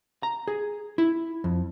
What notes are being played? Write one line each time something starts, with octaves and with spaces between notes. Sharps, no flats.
A#5
G#4
E4
F2